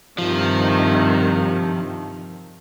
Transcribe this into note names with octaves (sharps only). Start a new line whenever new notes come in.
G2 C3 D#3 F3